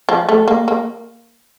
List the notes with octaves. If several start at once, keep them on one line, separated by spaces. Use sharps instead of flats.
F3
A3
A#3
A#3